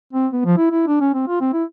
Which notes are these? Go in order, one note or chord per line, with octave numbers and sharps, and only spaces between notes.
C4
B3
F3
E4
E4
D4
C#4
C4
F4
C4
E4